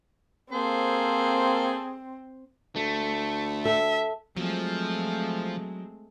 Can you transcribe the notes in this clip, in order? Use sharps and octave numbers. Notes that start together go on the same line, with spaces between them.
A#3 C4 G#4 A4 C5
D2 A3
A4 E5
F3 F#3 G#3 A3 C4